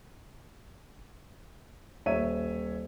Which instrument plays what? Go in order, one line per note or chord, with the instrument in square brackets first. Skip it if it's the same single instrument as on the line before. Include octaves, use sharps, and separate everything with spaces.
[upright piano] D#1 C#5 E5 D#7